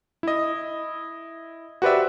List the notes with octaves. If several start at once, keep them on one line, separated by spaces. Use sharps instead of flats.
E4 D#5
F#4 G4 B4 C5 D5 E5